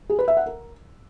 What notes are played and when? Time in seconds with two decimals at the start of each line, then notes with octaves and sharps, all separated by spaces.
0.10 G#4
0.19 B4
0.28 E5
0.37 F#5
0.46 A#4